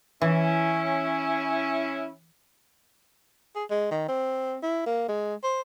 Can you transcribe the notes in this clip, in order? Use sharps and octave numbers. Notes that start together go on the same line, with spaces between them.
E3 C#4 E4
G#4
G#3
D#3
C4
E4
A#3
G#3
C5